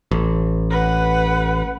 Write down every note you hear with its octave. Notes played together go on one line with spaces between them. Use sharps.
A1
B4 F#5